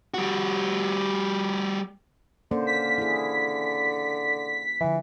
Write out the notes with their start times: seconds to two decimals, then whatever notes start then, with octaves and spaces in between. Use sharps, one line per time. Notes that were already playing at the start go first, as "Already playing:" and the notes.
0.14 G3 F#4
2.51 D3 A#3 C#4 C5
2.67 B6
2.98 E4 G#4
4.81 D3 E3 F3